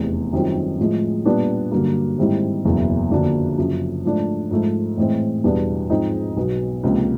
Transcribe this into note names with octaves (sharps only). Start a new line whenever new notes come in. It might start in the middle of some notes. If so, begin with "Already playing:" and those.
Already playing: F1 E2 C3
F#2 D#3 G3 C4 F4
A2 F3 G#3
A#2 G3 B3 D4 F4
G2 D3 F#3 A#3
G#2 D#3 G3 C4 E4
F#1 E2 B2
F2 D3 F#3 A#3 D4
F#2 C#3 F3
G#2 F3 A3 D4
G#2 F3 A3
A2 E3 G#3 C4
E2 B2 G3 B3 D4
G#2 F3 G#3 C4 D#4
B1 B2 F#3 B3
C#2 C3 F3 A#3